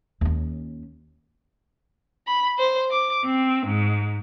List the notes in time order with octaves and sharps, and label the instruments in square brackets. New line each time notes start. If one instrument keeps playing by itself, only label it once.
[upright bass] D#2 C#4
[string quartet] B5
C5
D6
C4
G#2